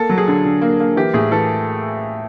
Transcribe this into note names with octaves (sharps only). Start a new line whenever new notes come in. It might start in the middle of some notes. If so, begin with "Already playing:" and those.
Already playing: A#3 A4
F#3
G#4
D3
D3
A#3
A#3
E3 G4
A2 G#4
E3 A4